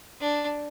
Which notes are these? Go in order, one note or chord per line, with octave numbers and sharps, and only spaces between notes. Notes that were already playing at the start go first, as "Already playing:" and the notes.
D4